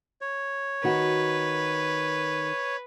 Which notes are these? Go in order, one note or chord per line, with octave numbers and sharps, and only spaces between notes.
C#5
D#3 F#4 B4